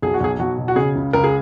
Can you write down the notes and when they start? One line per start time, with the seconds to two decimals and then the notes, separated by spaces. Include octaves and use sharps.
0.02 B1 G#4
0.14 F#4
0.20 B1 G#4
0.39 B1 F#4
0.58 B2
0.68 F#4
0.76 C#3 G#4
0.95 C#2
1.13 C#2 A#4
1.24 G#4